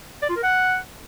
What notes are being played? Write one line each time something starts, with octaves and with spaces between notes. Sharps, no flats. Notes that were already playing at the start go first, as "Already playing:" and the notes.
D5
F4
A#4
F#5